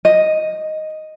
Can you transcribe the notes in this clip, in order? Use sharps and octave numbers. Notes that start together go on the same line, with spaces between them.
D#5